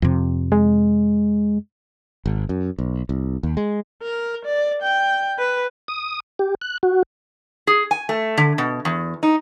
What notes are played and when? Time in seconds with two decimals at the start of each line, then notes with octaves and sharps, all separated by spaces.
0.02 F2 C3
0.52 G#3
2.26 G#1
2.49 F#2
2.79 B1
3.09 C2
3.43 D#2
3.57 G#3
4.03 A#4
4.45 D5
4.82 G5
5.39 B4
5.88 D#6
6.39 G4
6.61 F#6
6.83 F#4
7.67 G#4
7.91 G#5
8.09 A3
8.37 D3
8.58 B2
8.85 E2
9.23 D#4